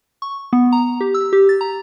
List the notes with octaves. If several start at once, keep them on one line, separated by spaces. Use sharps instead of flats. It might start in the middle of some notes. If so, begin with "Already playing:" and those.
C#6
B3
A#5
G4
E6
G4
A6
A#5